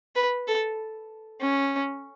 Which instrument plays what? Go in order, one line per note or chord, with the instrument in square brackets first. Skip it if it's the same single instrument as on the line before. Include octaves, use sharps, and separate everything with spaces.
[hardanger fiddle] B4
A4
C#4